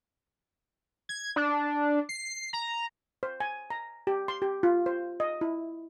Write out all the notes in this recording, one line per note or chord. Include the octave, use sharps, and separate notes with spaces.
G#6
D4
C7
A#5
C5
G#5
A#5
G4
C6
G4
F4
C5
D#5
E4